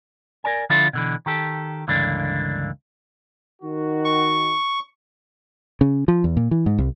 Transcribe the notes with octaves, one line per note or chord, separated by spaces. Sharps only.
A#4 D5 G#5
D3 F3 D4 E4 F4 A4
B2 D3 E3
D#3 G4 A4
C#2 G2 D3 E3 A#3 D4
D#3 F#4
C#6
C#3
F3
E2
A#2
E3
G#2
C2